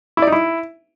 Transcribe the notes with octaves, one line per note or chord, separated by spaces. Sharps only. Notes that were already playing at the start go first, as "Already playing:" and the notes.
E4
D5
D#4
E4